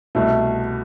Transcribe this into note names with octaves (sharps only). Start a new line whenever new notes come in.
C2 B2 A3